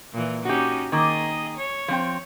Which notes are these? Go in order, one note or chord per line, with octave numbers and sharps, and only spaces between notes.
A#2 E3
C#4 D#4 F#4 G4
D#3 A#3 G#4 D#5
C#5
F3 C4 G5